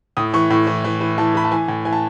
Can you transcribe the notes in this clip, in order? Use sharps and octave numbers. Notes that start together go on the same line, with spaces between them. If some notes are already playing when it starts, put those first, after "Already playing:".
A2 D#6
E3 C#6
A2
E3
E3
E3
E3 A5
E3 B5
A5
E3 G#5
A2
E3 G#5
A5